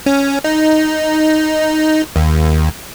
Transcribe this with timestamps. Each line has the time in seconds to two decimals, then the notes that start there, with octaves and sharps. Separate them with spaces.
0.06 C#4
0.44 D#4
2.16 D#2